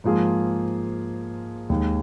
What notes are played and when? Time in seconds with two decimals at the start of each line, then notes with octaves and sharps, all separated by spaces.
0.04 G#2 F3 A#3 F4 G#4
1.70 D#2 D#3 G#3